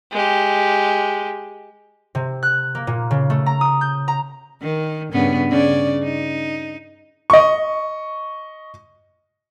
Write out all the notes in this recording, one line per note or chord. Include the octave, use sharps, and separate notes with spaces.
G#3 G4
C3
F#6
A#3
A#2
C#3
A3
A#5
D#6
G6
A#5
D#3
G2 C#3 B3
C#3 D5
D#4
D#5 C#6